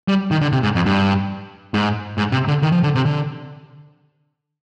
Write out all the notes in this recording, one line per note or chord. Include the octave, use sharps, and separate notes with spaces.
G3
D#3
D3
C3
G#2
F2
G2
G#2
G#2
C3
D3
D#3
F3
D3
C3
D3